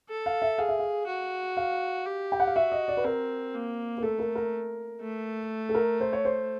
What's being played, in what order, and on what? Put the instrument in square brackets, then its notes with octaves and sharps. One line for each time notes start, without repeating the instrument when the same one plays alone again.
[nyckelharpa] A4
[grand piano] F5
E5
[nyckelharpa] G#4 [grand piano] F5
[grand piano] E5
F5
[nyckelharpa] F#4
[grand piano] F5
[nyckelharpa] G4
[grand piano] G5
F#5
F5
[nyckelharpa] F#4 [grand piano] E5
[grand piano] D#5
D5
B4
[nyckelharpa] C4 [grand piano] A#4
[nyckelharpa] A#3
[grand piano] A#4
[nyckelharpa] A3 [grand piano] A4
[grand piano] A#4
A#4
[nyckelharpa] A3
[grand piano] A4
A#4
C5
C#5
C5